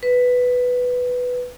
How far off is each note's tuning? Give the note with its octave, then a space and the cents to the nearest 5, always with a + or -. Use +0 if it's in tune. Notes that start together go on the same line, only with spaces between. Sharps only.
B4 +5